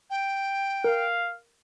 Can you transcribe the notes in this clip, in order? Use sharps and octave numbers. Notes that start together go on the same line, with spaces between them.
G5
A#4 F5